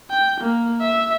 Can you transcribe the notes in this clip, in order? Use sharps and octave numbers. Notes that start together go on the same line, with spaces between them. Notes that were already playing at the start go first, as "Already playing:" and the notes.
G5
A#3
E5